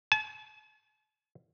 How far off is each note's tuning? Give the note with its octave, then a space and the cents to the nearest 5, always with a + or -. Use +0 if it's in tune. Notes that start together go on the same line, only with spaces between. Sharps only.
A5 -45